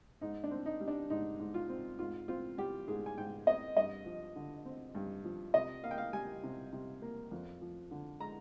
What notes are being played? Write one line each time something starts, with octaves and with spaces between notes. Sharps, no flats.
G#2 D#4
D4
C4
D#4
G3
D4
G#2 D#4
G#2
F4
C4
G#2 F4
C4 F4
G3 G4
G#2 G#4
G#5
G#2 G5
C4 D#5
G2 D#5
F3
D3
C4
G2
F3
C3 D#5
A#3 F5
G5
F5
G3 G#5
C3
C3
A#3
F2
F3
D3
G#3 A#5